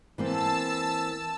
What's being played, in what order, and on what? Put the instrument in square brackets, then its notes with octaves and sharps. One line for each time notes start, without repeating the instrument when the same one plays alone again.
[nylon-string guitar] E3 A#3 C4 [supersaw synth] A5 E6